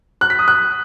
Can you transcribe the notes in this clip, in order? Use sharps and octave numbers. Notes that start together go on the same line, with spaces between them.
F#6
B6
D#6
F#6